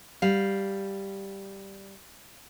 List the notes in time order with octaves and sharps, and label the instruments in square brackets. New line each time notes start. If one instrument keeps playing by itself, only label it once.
[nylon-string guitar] G3 F5